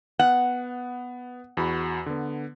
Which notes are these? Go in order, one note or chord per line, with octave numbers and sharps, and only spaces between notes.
B3 F#5
E2 F#4 B5
D3 B3